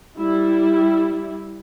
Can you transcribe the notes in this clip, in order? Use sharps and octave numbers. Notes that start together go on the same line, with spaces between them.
G3 E4